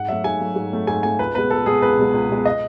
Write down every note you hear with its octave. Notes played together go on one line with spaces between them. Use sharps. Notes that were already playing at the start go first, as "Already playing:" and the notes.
Already playing: G#2 F#5
F#3 A3 E5
G#2 G#5
F#3 A3
G#2
F#3 A3
G#2 G#5
F#3 A3 G#5
C#2 B4
B2 G#3 B4
C#2 A4
B2 G#3 G#4
C#2 B4
B2 G#3
C#2
B2 G#3
D#5